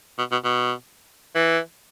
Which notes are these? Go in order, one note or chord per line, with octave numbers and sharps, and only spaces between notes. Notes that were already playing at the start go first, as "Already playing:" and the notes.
B2
B2
B2
E3